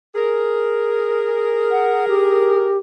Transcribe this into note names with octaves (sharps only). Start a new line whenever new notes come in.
G#4 A#4
F#5
G4